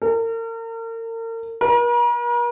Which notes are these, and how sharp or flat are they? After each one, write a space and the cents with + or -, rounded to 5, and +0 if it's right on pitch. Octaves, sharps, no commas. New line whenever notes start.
A#4 -40
A#4 +45